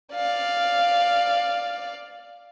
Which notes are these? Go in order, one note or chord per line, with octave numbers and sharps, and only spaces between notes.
D5 F5